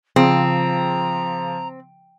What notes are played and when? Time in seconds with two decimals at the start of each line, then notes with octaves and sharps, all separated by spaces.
0.16 C#3 F3 C4 A#5